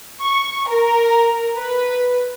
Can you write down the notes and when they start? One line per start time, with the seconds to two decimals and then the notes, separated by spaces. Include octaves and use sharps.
0.21 C#6
0.68 A#4
1.55 B4